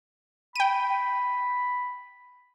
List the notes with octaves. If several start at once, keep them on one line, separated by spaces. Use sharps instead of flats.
G5 B5 D#7